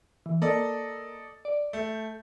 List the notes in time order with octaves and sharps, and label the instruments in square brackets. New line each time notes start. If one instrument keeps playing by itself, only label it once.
[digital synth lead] E3
[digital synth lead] A#3 [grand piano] A4 D5 D#5
[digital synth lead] D5
[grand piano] A3 [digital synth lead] G6